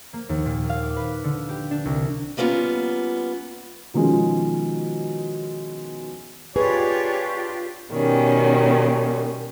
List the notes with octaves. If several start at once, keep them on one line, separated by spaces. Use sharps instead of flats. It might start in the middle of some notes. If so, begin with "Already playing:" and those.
A#3
D#2
A#2
F5
D6
B4
D3
G4
D4
C2
G3 A#3 B3 C#4 F4
B2 D#3 F3 G#3 C#4
D4 F4 G4 G#4 B4 C#5
B2 D#3 G3 C#4